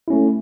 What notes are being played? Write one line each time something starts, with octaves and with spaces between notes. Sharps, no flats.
A3 C#4 E4